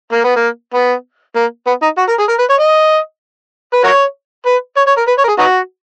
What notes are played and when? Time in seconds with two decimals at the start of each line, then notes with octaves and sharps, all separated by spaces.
0.12 A#3
0.24 B3
0.36 A#3
0.74 B3
1.35 A#3
1.67 B3
1.82 D#4
1.98 F#4
2.09 A#4
2.19 G#4
2.29 A#4
2.39 B4
2.50 C#5
2.60 D#5
3.73 B4
3.84 F#4 A#4 C#5
4.46 B4
4.77 C#5
4.87 C#5
4.97 A#4
5.08 B4
5.18 C#5
5.24 A#4
5.28 G#4
5.39 B3 D#4 F#4